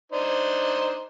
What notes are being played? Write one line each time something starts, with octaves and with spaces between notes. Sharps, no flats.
D4 D#4 C5